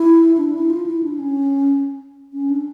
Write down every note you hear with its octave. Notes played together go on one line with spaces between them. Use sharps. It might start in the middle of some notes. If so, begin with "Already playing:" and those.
Already playing: E4
D4
E4
F4
E4
D4
C#4
C#4
D4